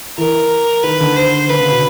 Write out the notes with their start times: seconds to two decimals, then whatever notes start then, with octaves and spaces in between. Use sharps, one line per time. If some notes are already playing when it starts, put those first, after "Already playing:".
0.18 E3 A#4
0.83 D#3 B4
1.00 D3
1.16 C5
1.49 D3 B4
1.61 C#3
1.71 B2